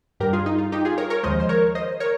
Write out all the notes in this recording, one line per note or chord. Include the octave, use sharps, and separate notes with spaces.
G2 G3 G4 A#4
F4 G#4
D#4
F4
D#4 G4
F4 G#4
A#4 C#5
A#4 C#5
D#2 C#3 F3 G#3 C5 D#5
C5
A#4 C#5
C5 D#5
A#4 C#5